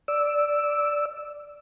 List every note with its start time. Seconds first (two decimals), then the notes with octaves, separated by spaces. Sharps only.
0.08 D5 E6